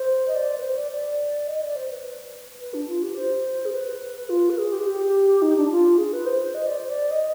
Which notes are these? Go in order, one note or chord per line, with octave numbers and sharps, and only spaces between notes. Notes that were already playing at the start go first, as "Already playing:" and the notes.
Already playing: C5
D#5
D5
B4
C5
D5
D5
D#5
D5
C5
B4
B4
D4
F4
G4
C5
G#4
B4
F4
B4
G#4
G4
G#4
G4
D#4
D4
F4
G#4
B4
C5
D#5
D5
C5
D5
D#5